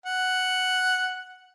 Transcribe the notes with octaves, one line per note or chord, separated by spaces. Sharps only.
F#5